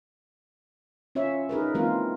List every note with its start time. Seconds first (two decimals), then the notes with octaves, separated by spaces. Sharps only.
1.15 C#4 F4 C#5 E5
1.49 D#4 G#4 A#4 B4
1.75 E3 G#3 A#3 C4 F4 A#4